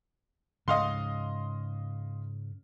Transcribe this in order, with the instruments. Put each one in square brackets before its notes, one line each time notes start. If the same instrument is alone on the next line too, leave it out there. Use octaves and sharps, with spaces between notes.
[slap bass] G#2 C#3 [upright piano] D#5 F5 C6